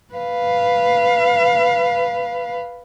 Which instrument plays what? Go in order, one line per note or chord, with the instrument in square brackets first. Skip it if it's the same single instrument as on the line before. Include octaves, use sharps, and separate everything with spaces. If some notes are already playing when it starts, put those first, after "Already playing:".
[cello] B4 F5